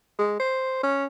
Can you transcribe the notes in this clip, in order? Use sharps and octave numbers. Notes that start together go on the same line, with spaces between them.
G#3
C5
C#4